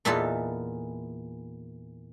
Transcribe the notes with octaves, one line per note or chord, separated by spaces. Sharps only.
E2 A#2 E3 D#4 F4 A4